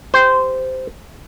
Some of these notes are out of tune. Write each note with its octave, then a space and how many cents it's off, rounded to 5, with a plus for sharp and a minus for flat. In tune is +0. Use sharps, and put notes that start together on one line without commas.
G4 +0 C5 -15